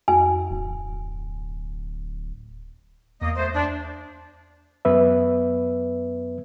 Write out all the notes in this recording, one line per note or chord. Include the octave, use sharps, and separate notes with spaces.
F2 F#4 G#5
D1
E2 A#3 D#5
A3 C5
D4
F#2 B3 B4 E5